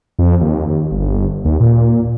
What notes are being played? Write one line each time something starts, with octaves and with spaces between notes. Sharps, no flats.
F2
D#2
G1
D#2
A#2